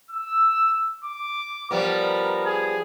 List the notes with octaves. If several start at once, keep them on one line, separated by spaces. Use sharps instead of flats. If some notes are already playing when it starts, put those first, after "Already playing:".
E6
D6
F3 G3 B3 A#4
G#4